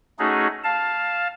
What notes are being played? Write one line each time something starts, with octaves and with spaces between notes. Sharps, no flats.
A3 C#4 D#4 F#4 G#4
F5 A5